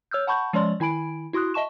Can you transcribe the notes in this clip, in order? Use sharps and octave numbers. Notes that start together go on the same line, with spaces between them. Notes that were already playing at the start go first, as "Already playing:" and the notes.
C#5 E6 F6 G6
F#5 A5 B5 C#6 G6
F3 G#3 C#4 C#5 D5 C6
D#3 E4 G#5 B5 D7
E4 F#4 C6 D#6 F#6
D#5 E5 A5 C#6 E7